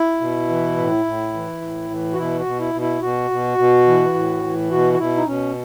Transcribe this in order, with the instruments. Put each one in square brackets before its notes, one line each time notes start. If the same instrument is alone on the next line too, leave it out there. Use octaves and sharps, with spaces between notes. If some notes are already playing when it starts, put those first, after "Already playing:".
Already playing: [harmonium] E4
B2
E3
A2
A2
E3
A2
E3
F#4
B2 E4
F#4
B2
E4
B2
E4
B2 F#4
B2
B2
E3
A2
E3
B2 F#4
F#4
B2 E4
D#4
B2 C#4